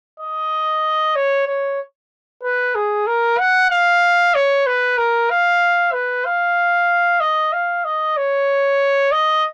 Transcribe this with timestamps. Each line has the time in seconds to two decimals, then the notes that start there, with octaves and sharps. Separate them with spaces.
0.20 D#5
1.16 C#5
1.47 C#5
2.43 B4
2.75 G#4
3.07 A#4
3.39 F#5
3.70 F5
4.35 C#5
4.66 B4
4.98 A#4
5.30 F5
5.93 B4
6.25 F5
7.21 D#5
7.53 F5
7.85 D#5
8.17 C#5
9.12 D#5